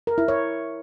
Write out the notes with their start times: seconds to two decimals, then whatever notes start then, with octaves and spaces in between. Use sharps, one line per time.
0.07 A#4
0.18 E4
0.28 C#5